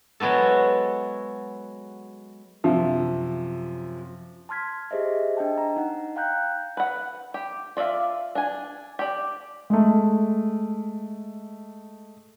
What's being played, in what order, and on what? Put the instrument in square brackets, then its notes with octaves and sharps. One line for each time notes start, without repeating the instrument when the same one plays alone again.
[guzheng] F#3 G#3 B3 F#4 A4
[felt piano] F#2 C3 F3 E5
[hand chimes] A5 C6 F6 G#6 B6
G4 G#4 C5 D#5 E5
D4 D#5 G5 A5
A#5
D#4 F#5
F5 G5 A#5 F#6 G6
[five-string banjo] B4 F#5
G4
F4 D5 E5 F5
D4 G#5
G4 D5
[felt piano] G#3 A3